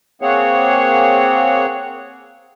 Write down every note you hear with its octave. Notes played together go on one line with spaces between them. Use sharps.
A#3 C4 G#4 C#5 F#5